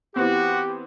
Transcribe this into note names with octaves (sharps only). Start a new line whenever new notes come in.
E3 B3 C4 F#4 G4